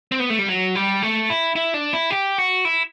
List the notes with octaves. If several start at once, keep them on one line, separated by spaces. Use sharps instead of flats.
C4
B3
A3
G3
F#3
G3
A3
E4
E4
D4
E4
G4
F#4
E4